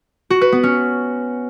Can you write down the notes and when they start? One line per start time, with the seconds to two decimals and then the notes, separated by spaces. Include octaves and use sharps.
0.30 F#4
0.41 B4
0.52 B3
0.63 C#4